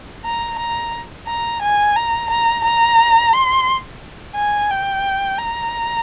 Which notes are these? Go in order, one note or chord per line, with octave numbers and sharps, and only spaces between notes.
A#5
A#5
A#5
G#5
A#5
A#5
A#5
C6
G#5
G5
A#5